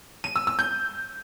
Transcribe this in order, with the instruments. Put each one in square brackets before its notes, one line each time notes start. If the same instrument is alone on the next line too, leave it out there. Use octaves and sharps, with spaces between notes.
[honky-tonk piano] D#7
E6
E6
G6